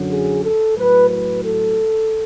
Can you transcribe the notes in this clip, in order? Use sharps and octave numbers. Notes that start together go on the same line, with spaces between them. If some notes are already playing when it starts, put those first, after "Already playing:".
Already playing: F#2 D3 F#3
G#4
A4
A2 F#3 B4
B4
A4